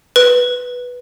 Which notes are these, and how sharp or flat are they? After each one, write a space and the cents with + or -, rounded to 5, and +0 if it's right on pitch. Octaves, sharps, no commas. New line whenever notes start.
B4 -5